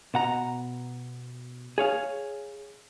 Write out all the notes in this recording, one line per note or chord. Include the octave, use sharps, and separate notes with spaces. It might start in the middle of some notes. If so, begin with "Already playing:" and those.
B2 F#5 A#5
G#4 C#5 F5